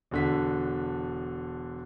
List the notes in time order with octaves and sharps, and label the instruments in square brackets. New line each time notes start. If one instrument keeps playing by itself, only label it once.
[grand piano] E1 D3 B6